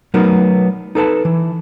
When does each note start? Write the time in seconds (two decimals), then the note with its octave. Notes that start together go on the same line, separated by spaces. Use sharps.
0.14 F#3 A3 B3 D#4 A#4
0.95 D#4 A4 B4 A5
1.25 E3